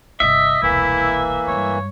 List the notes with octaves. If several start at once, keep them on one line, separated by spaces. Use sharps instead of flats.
G1 C3 D#5 E5
E1 C2 E3 A#3 E4
G2 G#3 C#5